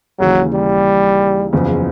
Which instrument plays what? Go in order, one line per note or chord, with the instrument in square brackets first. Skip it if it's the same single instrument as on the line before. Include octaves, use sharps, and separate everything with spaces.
[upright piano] D#2 C#3 E3 [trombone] F#3
[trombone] G3
[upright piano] F#1 E2 C#3 F3